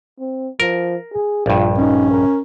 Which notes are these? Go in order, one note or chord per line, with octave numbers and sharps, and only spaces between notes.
C4
F3 A#4
G#4
A#1 G2 F4
C#4 D#4
A#4